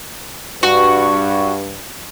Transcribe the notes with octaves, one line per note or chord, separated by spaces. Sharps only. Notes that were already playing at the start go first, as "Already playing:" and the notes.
G2 F#4